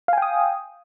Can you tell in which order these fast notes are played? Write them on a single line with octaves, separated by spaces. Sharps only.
F5 G#5 G5 D#6